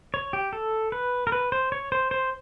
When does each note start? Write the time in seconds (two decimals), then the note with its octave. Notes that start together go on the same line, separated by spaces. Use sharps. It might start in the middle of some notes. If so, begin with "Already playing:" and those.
0.14 C#5
0.33 G4
0.53 A4
0.92 B4
1.27 A#4
1.32 B4
1.52 C5
1.72 C#5
1.92 C5
2.11 C5